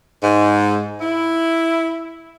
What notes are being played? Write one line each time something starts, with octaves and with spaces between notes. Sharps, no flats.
G#2
E4